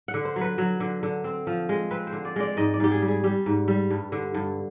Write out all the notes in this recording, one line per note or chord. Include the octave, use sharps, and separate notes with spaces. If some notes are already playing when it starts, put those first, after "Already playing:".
F#5
D3
C5
F#3
B4
F#3
D3
D3
C4
F3
G#3
C4 B4
C5
D3
D5
G#3 D5
G#2 D#5
D5
G#2 G4
G#4
G3
G#4
G3 G4
G#2
G3
G2
D3
G2